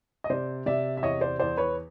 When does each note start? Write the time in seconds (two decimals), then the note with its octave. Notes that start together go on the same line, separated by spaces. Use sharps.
0.24 D#5
0.30 C3 C5 D5
0.66 C3 D5 E5
0.97 E5
1.02 E2 C#5 D#5
1.21 C5 D5
1.39 E2 C5 D5
1.57 B4 C#5